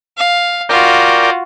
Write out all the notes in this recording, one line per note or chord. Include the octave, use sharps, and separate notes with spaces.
F5
F4 F#4 A#4 D5 G5